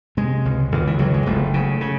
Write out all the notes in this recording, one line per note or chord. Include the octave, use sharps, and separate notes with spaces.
C3 G#3
C#2
C#2 D#3
E3
C#2 F#3
G#3
F#1 A3
C#3
C#3